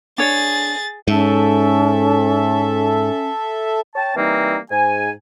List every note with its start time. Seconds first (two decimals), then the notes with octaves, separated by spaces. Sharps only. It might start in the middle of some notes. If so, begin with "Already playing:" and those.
0.18 D4 G#4 C#5 A6
1.08 G#2 C#4 A4 E5
3.95 C#5 G5 A5
4.16 E3 G3 A#3 C4 D#4
4.71 G#2 G#5